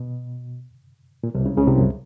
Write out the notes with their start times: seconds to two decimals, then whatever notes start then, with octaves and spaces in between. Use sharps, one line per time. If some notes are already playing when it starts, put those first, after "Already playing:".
Already playing: B2
1.23 A#2
1.35 C2 C3
1.45 C#2 C#3
1.57 C#2 C#3
1.67 C2 C3
1.78 F#2